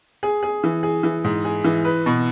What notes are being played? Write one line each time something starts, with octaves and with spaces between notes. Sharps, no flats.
G#4
G#4
E3
G#4
E3
G#2
G#4
E3
B4
B2